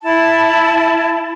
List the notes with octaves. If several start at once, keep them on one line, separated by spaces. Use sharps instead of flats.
E4 A5